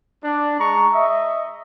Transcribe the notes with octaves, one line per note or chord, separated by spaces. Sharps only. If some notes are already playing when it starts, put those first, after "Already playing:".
D4
G#3 A#5 C#6
D#5 E5